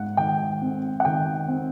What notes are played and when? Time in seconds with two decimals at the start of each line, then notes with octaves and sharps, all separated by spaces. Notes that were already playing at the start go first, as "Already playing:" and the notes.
Already playing: G#2 G#3 F#5
0.17 D#3 G5
0.62 C4
1.00 F#5
1.05 D#3 G5
1.48 C4